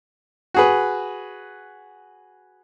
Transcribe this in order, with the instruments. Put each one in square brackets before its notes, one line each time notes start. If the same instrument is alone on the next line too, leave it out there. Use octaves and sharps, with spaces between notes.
[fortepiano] F#4 G#4 B4